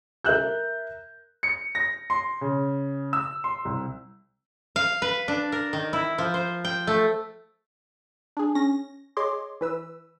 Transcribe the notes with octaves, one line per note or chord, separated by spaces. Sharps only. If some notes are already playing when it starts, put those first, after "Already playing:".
A#4 E5 F#6 G6
C#7
A#6
C6
C#3
E6
C6
C2
F5
B4
D4
A#4
D#3
E4
F3
C5
G5
A3
D4 G#4
C#4 A#6
G#4 C#5 D#5 C6 D6
E3 B4 E6